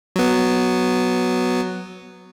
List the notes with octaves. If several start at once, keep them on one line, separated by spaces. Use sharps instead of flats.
F#3 B3